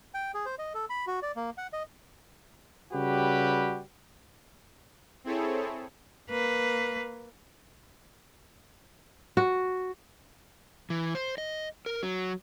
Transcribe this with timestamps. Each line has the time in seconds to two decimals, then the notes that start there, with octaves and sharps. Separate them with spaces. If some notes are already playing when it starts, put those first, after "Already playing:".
0.14 G5
0.34 G#4
0.46 C5
0.59 D#5
0.74 A4
0.90 B5
1.07 F#4
1.23 D5
1.36 A#3
1.58 F#5
1.73 D#5
2.92 C#3 G3 F#4 G4 B4
5.24 C4 E4 G#4 A4 C#5
6.30 A#3 B4
9.37 F#4
10.90 E3
11.15 C5
11.38 D#5
11.86 A#4
12.03 F#3